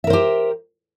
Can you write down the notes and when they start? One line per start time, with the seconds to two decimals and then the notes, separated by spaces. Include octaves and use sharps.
0.04 E5
0.07 A#4
0.10 C5
0.13 G4